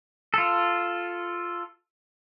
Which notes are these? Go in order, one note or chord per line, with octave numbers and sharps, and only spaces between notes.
F4 A4